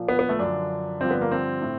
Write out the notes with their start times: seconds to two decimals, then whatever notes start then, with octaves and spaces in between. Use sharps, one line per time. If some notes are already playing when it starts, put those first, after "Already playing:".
Already playing: A#2 F3
0.09 B3
0.19 B3
0.29 A3
0.39 F#2 D3 F3 D4
1.00 G2 D3 F3 C4
1.11 B3
1.21 A#3
1.31 C4
1.62 A2